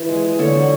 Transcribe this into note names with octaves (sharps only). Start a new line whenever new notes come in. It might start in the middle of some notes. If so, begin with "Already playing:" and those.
Already playing: E3 E4
G#3
G#3
D3 A4 C#5
F#3